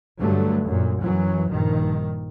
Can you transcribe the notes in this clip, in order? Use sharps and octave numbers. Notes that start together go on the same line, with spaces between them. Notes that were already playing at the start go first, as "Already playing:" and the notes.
G2 D3 F#3 A3
F#2 A#2
F#2 E3 F#3
A#1 G2 D#3